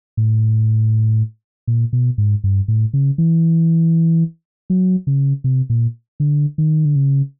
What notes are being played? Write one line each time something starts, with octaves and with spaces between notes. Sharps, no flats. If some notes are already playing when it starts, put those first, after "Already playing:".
A2
A#2
B2
G#2
G2
A2
C#3
E3
F#3
C#3
C3
A#2
D3
D#3
D3
C#3